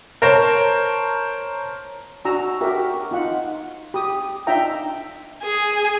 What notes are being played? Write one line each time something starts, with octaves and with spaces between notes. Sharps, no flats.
A#4 C5 C#5 A5
D4 F#4 A#5 E6
F#4 G4 A#4 E5
D#4 F4 F#5
G4 D#6
D4 D#4 F4 E5 G5 A#5
G#4